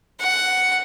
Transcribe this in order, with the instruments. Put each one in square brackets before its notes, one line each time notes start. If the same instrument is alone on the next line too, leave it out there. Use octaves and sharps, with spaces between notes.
[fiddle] F#5